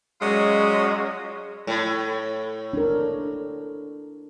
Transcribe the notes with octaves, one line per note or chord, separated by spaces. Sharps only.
F#3 G#3 C#4 F4 D5 D#5
A2
D4 A#4